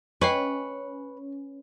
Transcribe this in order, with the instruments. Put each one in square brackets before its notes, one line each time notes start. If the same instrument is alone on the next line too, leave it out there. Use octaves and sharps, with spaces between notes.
[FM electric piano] C#4 [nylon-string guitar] B4 [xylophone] C#5 D#5 G5 [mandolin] C#6